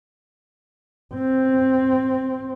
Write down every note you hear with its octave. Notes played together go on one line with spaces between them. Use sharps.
C4